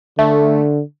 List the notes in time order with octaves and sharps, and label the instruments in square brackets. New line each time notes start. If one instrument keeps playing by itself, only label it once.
[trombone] D3 [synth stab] A3